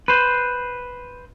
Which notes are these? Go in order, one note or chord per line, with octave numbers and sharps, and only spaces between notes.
B4 C5